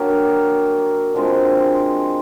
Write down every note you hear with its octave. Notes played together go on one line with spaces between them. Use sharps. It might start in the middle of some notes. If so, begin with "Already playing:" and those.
Already playing: F#3 A#3 D4 G4
D3 F3 G#3 C4